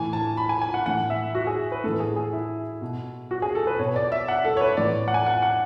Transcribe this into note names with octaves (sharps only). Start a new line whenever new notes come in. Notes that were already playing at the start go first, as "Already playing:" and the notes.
Already playing: A2 E3 G#5
A5
B5
G#5
G#5
F#5
A2 E3 F#5
E5
F#4
G#4
B4
A2 E3 A4
G#4
G#4
E4
B2
F#4
G#4
A4
B4
B2 C#5
D5
E5
F#5
A4
C#5
B4
A2 E3 D5
F#5
G#5
F#5
F#5